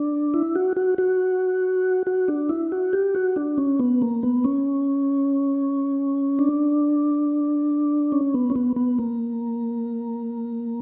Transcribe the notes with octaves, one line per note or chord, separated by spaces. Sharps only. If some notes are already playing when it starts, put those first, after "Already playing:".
Already playing: D4
E4
F#4
F#4
F#4
F#4
D4
E4
F#4
G4
F#4
D4
C#4
B3
A#3
B3
C#4
D4
C#4
B3
C#4
B3
B3
A#3